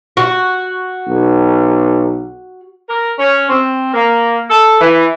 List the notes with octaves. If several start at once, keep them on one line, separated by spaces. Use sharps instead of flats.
F#4
B1
A#4
C#4
C4
A#3
A4
E3